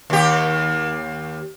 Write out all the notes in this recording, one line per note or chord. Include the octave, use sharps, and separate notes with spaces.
D#2 G4